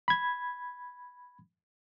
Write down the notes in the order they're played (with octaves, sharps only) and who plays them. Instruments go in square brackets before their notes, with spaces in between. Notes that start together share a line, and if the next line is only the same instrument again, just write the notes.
[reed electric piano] B5 G#6